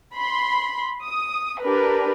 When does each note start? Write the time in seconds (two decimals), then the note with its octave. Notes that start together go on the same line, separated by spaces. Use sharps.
0.15 B5 C6
1.04 D#6
1.62 D4 G4 A#4 B4